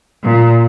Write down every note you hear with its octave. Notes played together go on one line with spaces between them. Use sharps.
A#2